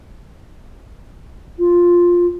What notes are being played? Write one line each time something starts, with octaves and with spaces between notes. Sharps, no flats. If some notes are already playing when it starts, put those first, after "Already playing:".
F4